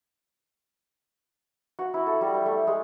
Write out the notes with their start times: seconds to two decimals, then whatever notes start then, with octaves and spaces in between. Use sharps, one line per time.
1.79 F#4
1.94 E4
2.07 A4
2.21 G3
2.34 G5
2.46 A3
2.67 G#3